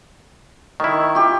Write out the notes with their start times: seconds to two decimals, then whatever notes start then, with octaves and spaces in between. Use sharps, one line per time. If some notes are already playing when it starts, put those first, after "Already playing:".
0.80 D#3 E4 C#6
1.15 F4 G4